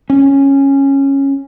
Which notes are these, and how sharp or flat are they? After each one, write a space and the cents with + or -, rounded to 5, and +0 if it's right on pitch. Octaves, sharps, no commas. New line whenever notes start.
C#4 -10